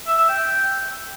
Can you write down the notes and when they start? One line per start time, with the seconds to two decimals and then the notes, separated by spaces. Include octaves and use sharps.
0.07 E5
0.18 E5
0.29 G5